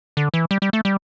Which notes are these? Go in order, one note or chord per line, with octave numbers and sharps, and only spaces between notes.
D3
E3
G3
G3
A3
G3